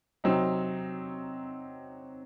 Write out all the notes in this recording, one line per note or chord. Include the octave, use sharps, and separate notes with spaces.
C3 F#3 C4 D#4